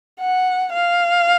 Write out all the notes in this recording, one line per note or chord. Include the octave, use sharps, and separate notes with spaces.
F#5
F5